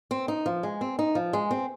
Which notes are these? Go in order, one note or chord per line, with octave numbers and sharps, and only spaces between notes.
C4
D#4
F3
G#3
C4
D#4
F3
G#3
C4